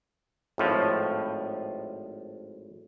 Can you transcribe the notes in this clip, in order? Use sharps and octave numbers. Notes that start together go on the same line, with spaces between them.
G#1 A2 F3